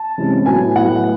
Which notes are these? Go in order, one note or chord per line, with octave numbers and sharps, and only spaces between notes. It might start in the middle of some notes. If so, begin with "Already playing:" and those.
Already playing: A5
C3 E3 G#3 C#4
A2 F#3 B3 G#5
A2 F#3 B3 F#5